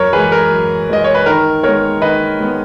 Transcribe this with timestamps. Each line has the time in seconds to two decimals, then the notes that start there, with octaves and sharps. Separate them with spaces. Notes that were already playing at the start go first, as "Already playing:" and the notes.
Already playing: F#2 A#4 C#5
0.13 E3 G#4 B4
0.17 G#3
0.32 A#4
0.51 F#2
0.89 E3 G#3 D#5
1.04 C#5
1.15 B4
1.26 D#3 A#4
1.63 G#3 B3 A#4 C#5
2.02 D#3 B4 D#5
2.40 G#3 B3